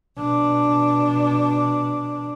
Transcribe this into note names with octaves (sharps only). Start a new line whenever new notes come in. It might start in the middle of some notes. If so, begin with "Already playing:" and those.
B2 D4